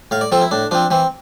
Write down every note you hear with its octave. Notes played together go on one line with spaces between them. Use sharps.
A2 F5
D5
F3 C4 A4
E4
A2 D4
F3 C4 D4
E3 C4